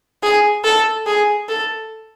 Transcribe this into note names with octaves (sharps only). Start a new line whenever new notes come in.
G#4
A4
G#4
A4